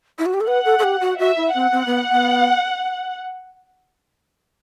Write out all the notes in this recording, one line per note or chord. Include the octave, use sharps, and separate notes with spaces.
E4
F#4
G4
A4
B4 F#5
A4
A4
G4
F#4
F#4 E5
E4
C4 F#5
C4
B3
B3